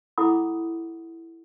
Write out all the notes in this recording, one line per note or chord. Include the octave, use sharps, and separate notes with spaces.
E4 A4 F#5 B5 D6 D#6